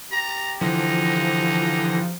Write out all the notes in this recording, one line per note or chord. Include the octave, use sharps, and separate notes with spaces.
G4 A#5
D3 E3 F3 D#4 A#6